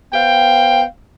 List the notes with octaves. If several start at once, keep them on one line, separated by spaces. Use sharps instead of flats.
B3 C5 F5 G5